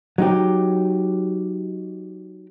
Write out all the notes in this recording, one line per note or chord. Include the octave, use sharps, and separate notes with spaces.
F#3 D#4 G4